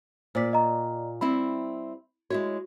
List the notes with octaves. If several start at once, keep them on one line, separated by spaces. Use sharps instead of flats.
A#2 C5 D5 B6
D#5 A#5
G3 C4 E4 B5
G#3 E4 F#4 C#5